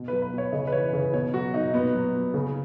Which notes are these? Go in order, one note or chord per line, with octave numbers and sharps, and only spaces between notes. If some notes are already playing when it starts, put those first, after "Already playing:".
Already playing: B2
B4
F#3
B4
B2 C#5
C#3 D#5
B4
E3 C#5
C#3 B4
B2 C#5
F#3 F#4
B2 D#4
A#2 B3
F#3
A#2
C#3